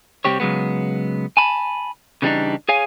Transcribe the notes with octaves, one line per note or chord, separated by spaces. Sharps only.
C2 F#2 G3 C4 G4 C#5
C#3 F#3 G#3 B3
G#5 A5 B5
C#3 E3 G3 G#3 D4 D#4
G#4 C#5 F5 G#5